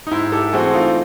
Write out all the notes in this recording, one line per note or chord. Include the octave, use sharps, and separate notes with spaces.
D#4
G#2 E4
G4 A4
E3 A3 C4 F#4 G#4
D#4 F4